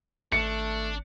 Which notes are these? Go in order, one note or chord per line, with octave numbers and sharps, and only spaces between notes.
G#1 A3 D4 C#7